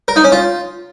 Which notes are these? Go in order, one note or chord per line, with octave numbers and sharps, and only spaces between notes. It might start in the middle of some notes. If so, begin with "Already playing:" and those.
A#4
D#4
C#4
F4